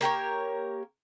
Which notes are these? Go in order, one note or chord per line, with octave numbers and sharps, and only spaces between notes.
A#3 G4 A#4 C#5